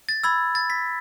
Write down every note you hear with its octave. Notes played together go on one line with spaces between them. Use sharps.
A6
B5 E6 G#6
A6
B6